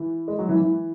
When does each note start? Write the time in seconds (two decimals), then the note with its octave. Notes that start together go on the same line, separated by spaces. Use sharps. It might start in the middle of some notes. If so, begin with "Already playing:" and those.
Already playing: E3
0.28 G#3
0.39 F#3
0.49 E3
0.60 E3